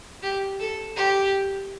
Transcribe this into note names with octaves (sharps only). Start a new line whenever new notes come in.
G4
A4
G4